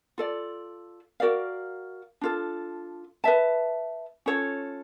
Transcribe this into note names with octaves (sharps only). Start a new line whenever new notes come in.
F4 A4 D5
F#4 A#4 D5 F5
D4 F4 A4
B4 E5 A5
C#4 F4 A4 C#5